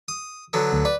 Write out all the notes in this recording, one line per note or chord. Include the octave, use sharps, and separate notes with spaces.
D#6
D3 F#3 B3
D2
B4 D5